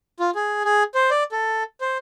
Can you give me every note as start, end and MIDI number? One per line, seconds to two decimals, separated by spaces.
0.20 0.30 65
0.35 0.63 68
0.64 0.83 68
0.95 1.10 72
1.11 1.24 74
1.32 1.63 69
1.81 1.98 72